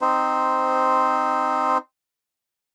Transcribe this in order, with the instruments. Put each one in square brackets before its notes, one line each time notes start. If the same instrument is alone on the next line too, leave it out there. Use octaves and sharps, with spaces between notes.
[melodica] C4 D#4 C5